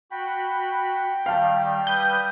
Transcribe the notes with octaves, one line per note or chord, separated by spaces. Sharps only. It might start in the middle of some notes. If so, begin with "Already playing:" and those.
F#4 G5 B5
D#3 G3 F5 A5
G3 B4 D#6 G6